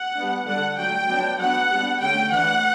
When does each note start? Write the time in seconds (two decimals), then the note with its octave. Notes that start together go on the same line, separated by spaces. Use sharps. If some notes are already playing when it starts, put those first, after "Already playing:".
Already playing: F#5
0.16 G3 B3 D4
0.47 D3 G3 D4 F#5
0.78 F#3 A3 D4 G5
1.08 F#3 B3 D4
1.39 F#3 B3 D4 F#5
1.70 G3 B3 D4
2.00 D3 A3 C#4 G5
2.31 E3 A3 D4 F#5